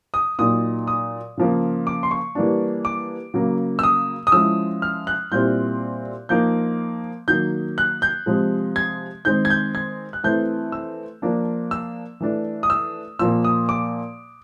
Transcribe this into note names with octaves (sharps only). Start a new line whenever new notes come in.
D#6
A#2 F#3 A#3 D#4 D#6
D#6
C#3 F3 A#3
D6
C6
C#6
E3 G3 A#3 D4
D6
C#3 F#3 A#3
E6
D#6
D#6
F3 G#3 C#4 E4 E6
F6
F#6
A#2 G3 C4 E4 G6
F3 A#3 D#4 G6
D#3 F#3 A#3 G6
F#6
G6
C3 F3 G#3 C4
G#6
D#3 G#3 C4 G6
G#6
G6
G#6
F#6
E3 A3 C4 E4 G6
E6
F3 A#3 D4
E6
E3 A3 D4
D#6
E6
A#2 F3 A#3 E6
D#6
D6